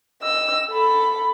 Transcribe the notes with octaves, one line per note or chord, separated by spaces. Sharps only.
D#5 E6
A4 B5